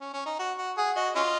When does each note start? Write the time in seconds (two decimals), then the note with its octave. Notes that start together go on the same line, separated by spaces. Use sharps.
0.01 C#4
0.13 C#4
0.26 D#4
0.39 F#4
0.58 F#4
0.77 G#4 F#5
0.96 F#4 D#5
1.15 C#4 F4 D#5